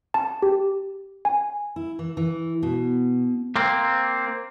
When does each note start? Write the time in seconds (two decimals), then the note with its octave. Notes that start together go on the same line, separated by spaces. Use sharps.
0.14 A5
0.42 G4
1.25 G#5
1.76 E4
1.99 E3
2.17 E3
2.63 B2
3.56 A#3 C4